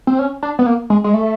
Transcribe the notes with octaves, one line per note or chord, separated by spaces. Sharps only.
C4
C#4
D4
B3
A#3
G#3
G#3
A3